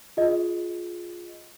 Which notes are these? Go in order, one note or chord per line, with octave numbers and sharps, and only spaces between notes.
F4 G#4 D#5